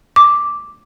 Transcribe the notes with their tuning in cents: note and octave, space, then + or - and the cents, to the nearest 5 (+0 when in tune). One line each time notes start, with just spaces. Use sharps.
D6 +0